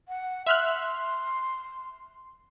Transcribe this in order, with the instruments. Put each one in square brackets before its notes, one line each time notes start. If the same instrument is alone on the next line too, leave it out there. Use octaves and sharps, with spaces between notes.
[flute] F#5
[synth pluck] E5 F6 F#6 [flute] C6